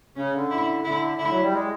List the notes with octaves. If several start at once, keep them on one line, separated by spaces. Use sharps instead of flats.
C#3 C#4
D3
E4
D3 E4
D3 E4
F#3
G3
G#3